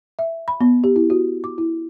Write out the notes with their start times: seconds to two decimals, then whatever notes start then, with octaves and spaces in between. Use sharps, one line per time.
0.19 E5
0.48 B5
0.61 B3
0.84 G4
0.96 E4
1.10 F#4
1.44 D6
1.58 E4